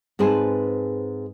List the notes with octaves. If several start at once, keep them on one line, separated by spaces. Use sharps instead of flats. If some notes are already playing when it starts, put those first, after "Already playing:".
G#2 C4 G#4 B4 G#5 A5